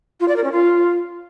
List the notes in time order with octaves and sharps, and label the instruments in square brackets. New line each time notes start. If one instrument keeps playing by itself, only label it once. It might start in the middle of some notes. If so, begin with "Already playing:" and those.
[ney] F4
D5
A#4
C#4
F4